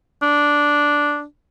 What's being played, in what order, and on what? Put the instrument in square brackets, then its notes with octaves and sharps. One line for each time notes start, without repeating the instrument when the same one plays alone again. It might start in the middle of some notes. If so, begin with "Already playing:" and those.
[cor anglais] D4